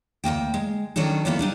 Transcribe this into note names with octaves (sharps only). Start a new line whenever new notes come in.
D2 E3 A#3 G5
G#3
D#3 F#3 C#4 D4 A4
D3 F#3 A#3 B3 E4 A4
G3 D4 D#4